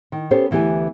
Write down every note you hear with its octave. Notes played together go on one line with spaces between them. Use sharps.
D#3
B3 C#4 G4 A4 C5
D2 E3 B3 G4 G#5